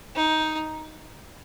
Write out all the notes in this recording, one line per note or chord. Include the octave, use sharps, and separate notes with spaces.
D#4